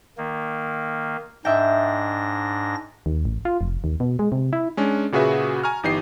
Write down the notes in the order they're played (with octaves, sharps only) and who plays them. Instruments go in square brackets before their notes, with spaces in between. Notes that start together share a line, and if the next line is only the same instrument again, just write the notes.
[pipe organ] D#3 A#3
[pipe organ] G#2 D4 A#6 [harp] D#5 E5 G5
[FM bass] D#2
A1
F4
F1
D#2
B2
G#3
C3
E4
[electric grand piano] G#3 C#4 D4
A#2 C#3 F#4 G#4 B4 E5
G#5 A#5 C#6 F6
G1 E3 D#4 G4 D#5 C7